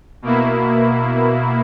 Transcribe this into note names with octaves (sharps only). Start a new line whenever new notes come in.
B2 A#3 E4